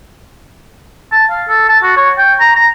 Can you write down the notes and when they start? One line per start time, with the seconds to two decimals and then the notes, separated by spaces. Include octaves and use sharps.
1.12 A5
1.31 F5
1.49 A4
1.69 A5
1.83 F#4
1.97 C#5
2.18 G5
2.40 A#5
2.55 A#5